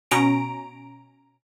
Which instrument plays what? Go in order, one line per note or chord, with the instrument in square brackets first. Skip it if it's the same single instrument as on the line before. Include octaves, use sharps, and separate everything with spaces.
[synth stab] B2 C#4 A#5 D7